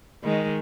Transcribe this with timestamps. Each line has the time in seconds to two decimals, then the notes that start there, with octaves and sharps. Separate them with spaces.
0.24 D#3 G#3